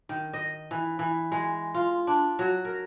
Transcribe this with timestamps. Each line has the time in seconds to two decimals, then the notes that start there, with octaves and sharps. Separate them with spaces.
0.09 D#3
0.33 D#5
0.71 E3
0.99 E3
1.32 G#3
1.74 F4
2.07 D4
2.39 F#3
2.65 A#4